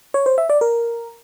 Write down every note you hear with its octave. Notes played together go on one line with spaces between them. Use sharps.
C#5
C5
E5
D5
A#4